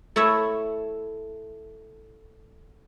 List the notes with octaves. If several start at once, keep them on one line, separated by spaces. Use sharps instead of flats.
A3 E4 C#5 E5